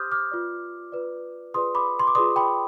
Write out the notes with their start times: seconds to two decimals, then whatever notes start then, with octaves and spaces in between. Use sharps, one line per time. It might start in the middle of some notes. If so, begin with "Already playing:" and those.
Already playing: G4 C5 C6 D6 D#6 F6 G6
0.12 D6 F6
0.31 F4 B4 D5
0.92 F4 B4 D5
1.54 F4 G#4 B4 D5 C6 D#6
1.75 B5 D6
1.99 C6
2.07 D6
2.15 F4 G#4 B4 D5 C6 D#6
2.36 G5 B5